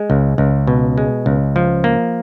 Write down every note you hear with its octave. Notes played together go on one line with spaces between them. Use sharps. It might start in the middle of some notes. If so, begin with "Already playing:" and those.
Already playing: G#3
C#2
C#2
B2
G#3
C#2
F3
A#3